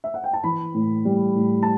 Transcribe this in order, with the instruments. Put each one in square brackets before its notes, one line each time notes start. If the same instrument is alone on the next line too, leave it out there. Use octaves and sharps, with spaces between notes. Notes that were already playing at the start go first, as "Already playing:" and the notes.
[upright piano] E5
F#5
G5
A5
E3 B5
A2
G3
A2
A5